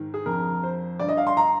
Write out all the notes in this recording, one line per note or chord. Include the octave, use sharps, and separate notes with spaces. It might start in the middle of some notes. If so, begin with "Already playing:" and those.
Already playing: G#2 D#3
G#4
F2 D3 A#4
C5
G2 D3 D5
D#5
F5
C6
A#5